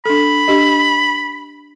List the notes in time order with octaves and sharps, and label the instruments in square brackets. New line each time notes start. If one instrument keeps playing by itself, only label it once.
[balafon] D4 A4 [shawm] B5
[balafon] D4 G4 D#5